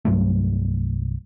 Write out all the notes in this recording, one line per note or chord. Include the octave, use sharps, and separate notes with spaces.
C2 G2 F#3 A3